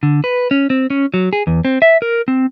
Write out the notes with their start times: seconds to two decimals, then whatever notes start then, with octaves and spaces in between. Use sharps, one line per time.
0.03 D3
0.24 B4
0.51 C#4
0.70 C4
0.90 C#4
1.14 F#3
1.33 G#4
1.47 E2
1.65 C4
1.82 E5
2.02 A#4
2.28 C4